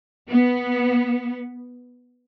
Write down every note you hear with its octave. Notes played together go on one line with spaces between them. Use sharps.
B3